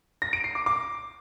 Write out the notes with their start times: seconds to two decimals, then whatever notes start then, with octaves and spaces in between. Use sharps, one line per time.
0.22 A#6
0.33 D7
0.44 C7
0.55 D6
0.66 D6